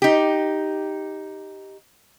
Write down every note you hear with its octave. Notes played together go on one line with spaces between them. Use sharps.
D#4 G4